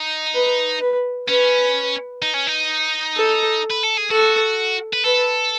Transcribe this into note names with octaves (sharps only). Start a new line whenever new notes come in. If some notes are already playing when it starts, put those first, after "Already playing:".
Already playing: D#4
B4
B4
C#4 B4
D#4
C#4
D#4
A4
B4
A4
G#4
F#4 A4
B4
A4 B4